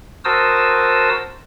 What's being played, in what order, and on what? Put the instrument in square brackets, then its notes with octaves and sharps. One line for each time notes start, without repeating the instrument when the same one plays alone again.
[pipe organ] F#4 A#4 C5 A5 D#6 E6